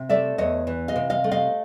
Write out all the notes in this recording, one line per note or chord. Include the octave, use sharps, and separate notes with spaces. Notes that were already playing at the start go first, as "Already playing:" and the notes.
Already playing: C3
A3 D5 E5
E2 C#5 D#5
E3
D#5 F5
C3
D#5 F5
A3
D#5 F5